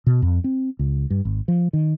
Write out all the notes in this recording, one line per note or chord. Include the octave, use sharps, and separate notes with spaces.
B2
F2
C4
C#2
G2
G#1
F3
D#3